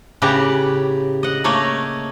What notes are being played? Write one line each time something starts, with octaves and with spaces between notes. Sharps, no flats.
A2 C#3 G4 B4 F#5 A#5
D#5 F#5
A3 A#3 C#5 D#5